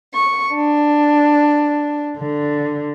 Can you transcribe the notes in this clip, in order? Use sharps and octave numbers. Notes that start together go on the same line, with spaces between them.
C#6
D4
D3